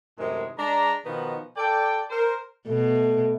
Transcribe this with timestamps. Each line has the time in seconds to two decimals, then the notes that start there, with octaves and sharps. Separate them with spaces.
0.19 F#2 A2 C3 D#3 G#3
0.59 G#3 D4 A#5
1.05 B2 D#3 F3 B3 D#4 F#4
1.57 A4 D5 G5
2.10 A#4 C5
2.68 B2 A3